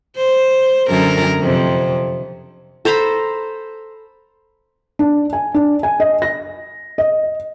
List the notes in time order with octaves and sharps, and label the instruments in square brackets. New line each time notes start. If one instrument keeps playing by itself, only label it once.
[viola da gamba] C5
F#2 D3 A#4
F2 C3
[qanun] A4 C5 A#5 B5
[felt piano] D4
G#5
D4
G#5
D#5
A#6
D#5